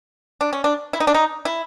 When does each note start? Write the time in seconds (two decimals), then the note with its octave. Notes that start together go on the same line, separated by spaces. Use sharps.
0.41 D4
0.53 C#4
0.64 D4
0.93 E4
1.00 D#4
1.07 D4
1.14 D#4
1.45 E4